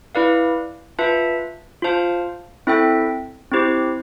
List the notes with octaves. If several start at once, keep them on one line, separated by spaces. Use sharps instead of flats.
E4 B4 D5 F5
F4 B4 E5 A5
F4 C5 F5 A5
C4 E4 A4 E5 G5
C4 E4 G4 C5